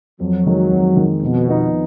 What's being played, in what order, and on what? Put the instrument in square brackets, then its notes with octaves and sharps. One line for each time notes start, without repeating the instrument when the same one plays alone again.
[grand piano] F2 [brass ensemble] F#3
[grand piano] D#3 G#3
F2
D#3 G#3
[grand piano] F2 [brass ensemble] B2
[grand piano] F3 B3 D#4